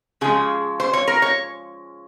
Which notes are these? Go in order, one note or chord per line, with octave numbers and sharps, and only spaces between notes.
C#3 F3 G#3 G#4
C5
C#5
A#4
C#5